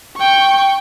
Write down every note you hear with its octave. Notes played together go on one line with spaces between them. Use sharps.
G5 C#6